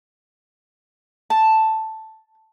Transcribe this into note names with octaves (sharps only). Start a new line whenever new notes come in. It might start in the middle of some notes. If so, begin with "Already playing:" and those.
A5